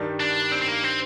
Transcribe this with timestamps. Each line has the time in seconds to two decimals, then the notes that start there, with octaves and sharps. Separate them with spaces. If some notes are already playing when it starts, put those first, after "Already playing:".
Already playing: G2 D#3 G3
0.20 D4
0.52 C4
0.62 C4
0.68 A#3
0.84 C4